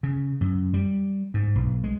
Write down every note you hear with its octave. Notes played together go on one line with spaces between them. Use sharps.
C#3
F#2
G3
G#2
B1
G#3